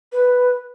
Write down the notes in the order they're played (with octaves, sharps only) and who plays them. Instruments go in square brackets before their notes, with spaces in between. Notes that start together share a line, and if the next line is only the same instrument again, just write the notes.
[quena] B4